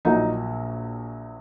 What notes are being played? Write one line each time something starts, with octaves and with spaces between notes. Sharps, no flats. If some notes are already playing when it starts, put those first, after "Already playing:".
A#1 A#2 F#3 D#4